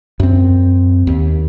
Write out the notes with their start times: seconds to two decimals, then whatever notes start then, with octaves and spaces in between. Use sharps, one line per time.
0.20 F#2 C4
1.07 D#2